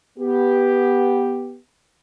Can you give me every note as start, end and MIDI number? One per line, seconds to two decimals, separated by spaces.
0.19 1.59 59
0.19 1.59 67